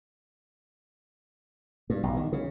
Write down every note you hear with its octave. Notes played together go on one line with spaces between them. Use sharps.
G2
B1
D#3
C#3